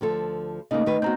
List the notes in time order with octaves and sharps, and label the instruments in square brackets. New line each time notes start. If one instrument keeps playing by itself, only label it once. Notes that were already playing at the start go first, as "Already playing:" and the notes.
[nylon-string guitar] D2 F3 A4
[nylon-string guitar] C#3 A#3 [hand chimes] A3 D#4 D#5
[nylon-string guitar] D#3 B4
[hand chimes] B3 A#5 G6 [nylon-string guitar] C4 F#4